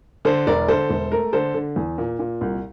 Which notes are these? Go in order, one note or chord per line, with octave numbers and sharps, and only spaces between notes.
D3 A4 C5
E1 A#4 D5
D3 A4 C5
E1
A3 A#4
D3 A4 C5
D3
E2
A#2
A#2
C2